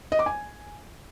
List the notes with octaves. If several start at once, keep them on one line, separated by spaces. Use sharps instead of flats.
D#5
D6
G#5